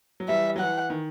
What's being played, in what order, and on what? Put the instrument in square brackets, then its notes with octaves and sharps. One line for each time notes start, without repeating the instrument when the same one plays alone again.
[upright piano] F#3
[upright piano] E3 G3 [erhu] E5
[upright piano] F#3
[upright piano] E3 [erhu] F#5
[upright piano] D#3